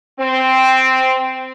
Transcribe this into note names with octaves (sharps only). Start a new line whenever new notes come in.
C4